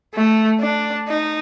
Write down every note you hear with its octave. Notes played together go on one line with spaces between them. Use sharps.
A3
D4
D#4